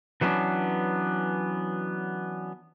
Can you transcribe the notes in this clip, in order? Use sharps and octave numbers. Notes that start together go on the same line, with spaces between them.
E3 F#3 A3 B3 C#4 D4